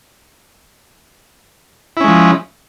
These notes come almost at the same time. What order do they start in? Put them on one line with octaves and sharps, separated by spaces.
E4 C#4 G#3 F3